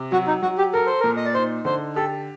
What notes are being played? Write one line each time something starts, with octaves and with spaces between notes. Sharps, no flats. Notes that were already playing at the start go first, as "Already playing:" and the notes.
Already playing: C3
F#3 F#4
D#4
F#3 F#4
G4
A4 A#4
C5
A#2 A#4
D#5
D5
D#4 C5
D3 C5
G4 A4